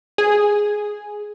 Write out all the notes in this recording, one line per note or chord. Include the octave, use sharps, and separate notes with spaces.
G#4